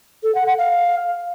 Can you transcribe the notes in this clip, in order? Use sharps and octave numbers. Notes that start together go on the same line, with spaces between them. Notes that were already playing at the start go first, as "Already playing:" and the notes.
A4
F#5
F#5
F5